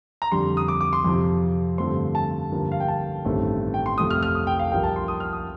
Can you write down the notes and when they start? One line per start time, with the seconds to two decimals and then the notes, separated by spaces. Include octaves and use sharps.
0.22 A#5
0.32 F2 D3 G3 C6
0.57 D#6
0.68 D6
0.81 D6
0.93 C6
1.05 F2 C3 F3
1.78 G2 D3 F3 A3 C4 C6
2.15 A5
2.52 G2 D3 F3 A#3
2.72 F5
2.80 G5
2.88 A5
3.25 A1 G2 D#3 A3 C4
3.74 G5
3.86 C6
3.98 F2 C3 F3 A3 D#6
4.10 F6
4.23 F6
4.35 D#6
4.47 G5
4.59 F5
4.71 A#1 A#2 G3 A#3 G5
4.83 A5
4.96 C6
5.08 D#6
5.20 F6
5.33 D#6